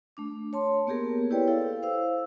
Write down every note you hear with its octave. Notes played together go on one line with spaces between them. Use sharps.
A3 D4 D6
C#5 A5 C6
A#3 B3 G4 G#4 A#4
E4 G4 B4 C#5 D5 G5
E4 A4 F5
C5 F5 E6